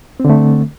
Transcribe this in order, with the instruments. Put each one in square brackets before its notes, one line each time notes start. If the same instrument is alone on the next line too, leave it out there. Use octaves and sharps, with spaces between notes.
[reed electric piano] C4
D3
A3